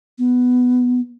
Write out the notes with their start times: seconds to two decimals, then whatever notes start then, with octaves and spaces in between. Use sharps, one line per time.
0.19 B3